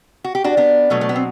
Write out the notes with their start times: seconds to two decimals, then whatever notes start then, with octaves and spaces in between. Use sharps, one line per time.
0.24 F#4
0.35 G4
0.44 D4 F#4
0.57 B3 D4
0.90 B2 F#3 A3
1.01 A3
1.09 B3
1.16 C4